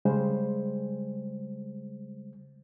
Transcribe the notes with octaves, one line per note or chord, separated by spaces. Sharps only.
C#3 G3 G#3 C5